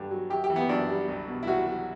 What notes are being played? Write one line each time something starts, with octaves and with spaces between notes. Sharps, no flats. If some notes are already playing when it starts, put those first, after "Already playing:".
Already playing: G2 D3
F#3
F#2 G4
G4
E3
B3
F#2 D4
G3
C2
B2
E4
C2 F#4
F#3